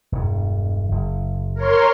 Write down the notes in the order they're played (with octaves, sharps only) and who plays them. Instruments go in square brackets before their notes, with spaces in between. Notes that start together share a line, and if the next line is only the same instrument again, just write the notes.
[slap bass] E1 G2
F#1
[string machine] A#4 C#5 C6